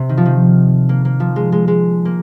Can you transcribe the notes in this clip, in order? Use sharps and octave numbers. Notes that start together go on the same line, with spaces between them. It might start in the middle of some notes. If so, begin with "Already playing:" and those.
Already playing: C3
D#3
F3
D#3
A#3
A#3
F3
G#3
G#3
G#3
A#3